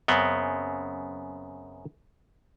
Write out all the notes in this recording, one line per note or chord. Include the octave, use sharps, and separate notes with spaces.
F#2 C#3 B3 C4